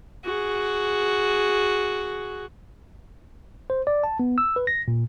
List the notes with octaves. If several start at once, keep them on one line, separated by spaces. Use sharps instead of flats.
F#4 G#4
C5
D5
A5
B3
E6
B4
A#6
A#2